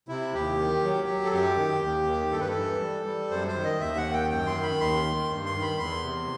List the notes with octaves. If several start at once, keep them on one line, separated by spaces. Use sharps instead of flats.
C3 E4
D#2 G4
D#3
F#3
F#3
A4
F#2 G4
D#3
D#2
D#3
G2 A4
B4
A4
E3
G3
G3
F#2 C5
C5
D#3
D#5
D#2 E5
F#5
D#3
G5
F#2 G5
C6
D#3
B5
D#2 C6
D#3
G2
C6
D#3
B5
E2 C6
C3